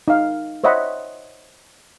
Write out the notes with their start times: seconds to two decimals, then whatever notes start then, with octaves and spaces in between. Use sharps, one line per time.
0.08 D#4 F5
0.64 C5 C#5 D#5 E5 F#5 B5